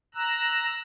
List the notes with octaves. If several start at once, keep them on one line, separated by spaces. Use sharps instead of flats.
A#5 E6 F#6